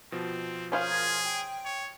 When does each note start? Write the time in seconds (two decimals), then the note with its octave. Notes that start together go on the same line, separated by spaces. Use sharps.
0.12 B2 F3 C4
0.72 C#4 F4 G#4 A#4 C5 F5 G#6
1.22 G5
1.65 C#5